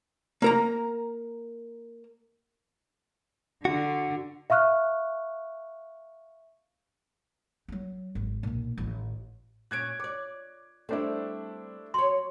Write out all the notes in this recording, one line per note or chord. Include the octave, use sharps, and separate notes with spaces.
A#3 A#4 A#5
D3 F#4
E5 F5 C#6 F6 F#6
F#3 G3
G#1
B1 A#2
A1 D#3
A#2 C#4 F#6 G#6 D7
C#5 D5 D6
G3 A3 C4 D4 E4
F#3 C#5 C6